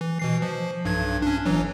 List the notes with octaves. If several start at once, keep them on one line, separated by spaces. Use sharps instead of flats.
E3
B2 E3 C7
F3
B1 G2 G#6
C#4 D4
G1 E3 F#3